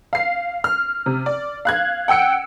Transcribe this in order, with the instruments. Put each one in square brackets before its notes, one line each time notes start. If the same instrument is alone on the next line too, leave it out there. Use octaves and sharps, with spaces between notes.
[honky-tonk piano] F5 C7
F6
C3
D5
F5 F#6 G#6
F#5 G5 E6 C#7 D7